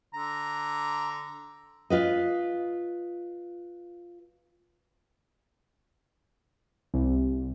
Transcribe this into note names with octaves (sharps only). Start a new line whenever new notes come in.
D3 A#5
F4 B4 D#5
C2